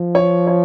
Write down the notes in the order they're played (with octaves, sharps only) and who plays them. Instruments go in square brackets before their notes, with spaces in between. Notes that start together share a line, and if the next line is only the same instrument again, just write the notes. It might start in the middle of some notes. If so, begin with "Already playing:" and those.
Already playing: [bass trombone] F3
[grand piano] C#5
C#5